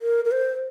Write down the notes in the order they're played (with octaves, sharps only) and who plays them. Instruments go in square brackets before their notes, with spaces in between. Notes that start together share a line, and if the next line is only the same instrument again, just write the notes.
[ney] A#4
A#4
C5